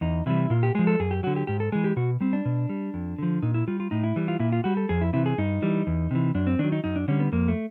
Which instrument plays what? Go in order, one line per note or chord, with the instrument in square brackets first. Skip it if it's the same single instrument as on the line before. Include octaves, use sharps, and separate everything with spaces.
[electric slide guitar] E2 D#4
C3 E3 G3 E4
A#2 F4
G4
F3 G#3 G#4
A4
F#2 G#4
G4
D3 F#3 F#4
G4
G#2 G4
A4
E3 G#3 G#4
G4
B2 F#4
G3 C4
D4
B2
G3
F2
D3 F3
A#2 D#4
E4
G3 F4
F4
A2 D#4
E4
E3 G3
F4
A#2 E4
F4
G3 F#4
A4
F2 G#4
E4
C3 E3 E4
G#4
G2 D#4
E3 G3
E2
C3 E3
F#2 D4
C4
D#3 F#3 D4
D#4
F#2 D#4
D4
D3 G3 C#4
B3
F2 A#3
A3